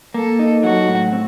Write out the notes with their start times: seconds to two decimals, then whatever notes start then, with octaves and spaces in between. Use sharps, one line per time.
0.14 A#3 A4
0.39 D#4
0.63 F#3 F#4
0.88 A2
1.12 C4